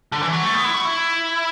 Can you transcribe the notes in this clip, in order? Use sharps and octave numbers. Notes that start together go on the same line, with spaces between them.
D3
E3
F#3
A3
B3
E4
F#4
E4